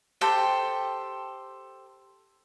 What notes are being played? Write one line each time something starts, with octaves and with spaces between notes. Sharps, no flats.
G4 A4 C5 G5